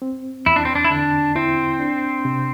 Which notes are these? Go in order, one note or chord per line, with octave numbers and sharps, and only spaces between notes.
C4
E2 E4
D4
C4
D4
E4
D3 D4
C4 E4
D4
C3